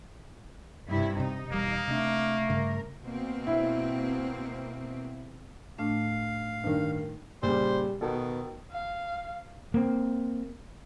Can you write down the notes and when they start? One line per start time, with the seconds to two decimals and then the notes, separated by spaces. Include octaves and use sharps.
0.88 G2 C3 E4
1.20 C3 D#4
1.52 E1 G3 A#3
1.88 C3 A3 D4
2.50 G2 C#3 A#4
3.03 B2 A#3 C4
3.47 E4
5.79 A2 A3 D4 F5
6.64 G2 D#3
7.43 A#2 C#3 G3 C5
8.01 B2 D#3 A4
8.72 F5
9.74 A#3 C4